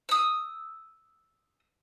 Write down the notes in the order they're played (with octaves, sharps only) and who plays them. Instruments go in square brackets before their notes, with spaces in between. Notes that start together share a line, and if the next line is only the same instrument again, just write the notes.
[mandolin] D#6 E6